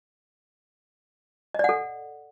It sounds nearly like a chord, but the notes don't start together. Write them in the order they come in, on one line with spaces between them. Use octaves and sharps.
D#5 D5 F#5 A4